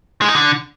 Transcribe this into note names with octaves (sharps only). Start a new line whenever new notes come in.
G#3
D#4
D3